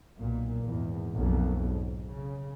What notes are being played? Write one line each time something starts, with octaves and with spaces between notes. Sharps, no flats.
B1 A#2
G#1 E2
B1 F2 A#2
G#2
C#3